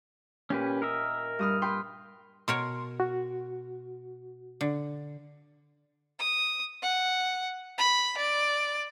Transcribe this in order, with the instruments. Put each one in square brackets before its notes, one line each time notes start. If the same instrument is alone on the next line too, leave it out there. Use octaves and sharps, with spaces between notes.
[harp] A#2 [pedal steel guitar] C#4 G4 B4
[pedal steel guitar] A#4 D#5 E5
[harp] G2 D#6 F6
B4 G5 C6
[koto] B2 A#4 C#5 [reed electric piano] C6
[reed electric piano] F#4
[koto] D3
[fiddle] D#6
F#5
B5
D5